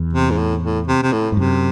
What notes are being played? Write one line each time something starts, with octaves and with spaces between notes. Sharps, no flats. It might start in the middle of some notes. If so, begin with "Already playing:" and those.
Already playing: E2
C3
G#2
A2
A2
C3
C3
A2
G#2
F#2 C3